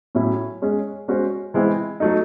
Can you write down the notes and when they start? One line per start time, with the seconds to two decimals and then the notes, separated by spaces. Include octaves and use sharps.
0.15 A2 F#3 C#4 E4
0.62 G#3 C#4 G#4
1.08 G#3 C#4 F#4 C5
1.54 E3 G#3 C4 E4
2.00 F#3 A3 D#4